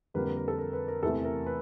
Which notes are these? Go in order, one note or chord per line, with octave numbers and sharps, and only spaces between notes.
F2 D3 G3 A#3 B4
B4
A#4
A4
A#4
B4
A#4
E2 C3 E3 A3 A4
A#4
B4